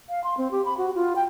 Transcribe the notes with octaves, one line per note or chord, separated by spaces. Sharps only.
F5
C6
C4
G4
B5
F#4
F4
G5